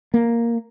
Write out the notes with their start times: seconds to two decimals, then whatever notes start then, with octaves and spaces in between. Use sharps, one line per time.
0.14 A#3